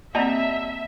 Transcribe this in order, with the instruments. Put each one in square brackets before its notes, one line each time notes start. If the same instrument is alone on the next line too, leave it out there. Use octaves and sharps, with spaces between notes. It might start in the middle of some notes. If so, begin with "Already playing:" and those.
[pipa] G3 D#5 A#5 [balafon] A#3 C4 [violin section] E5 [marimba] F#5 A5